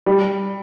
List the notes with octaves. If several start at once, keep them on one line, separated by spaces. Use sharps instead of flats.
G3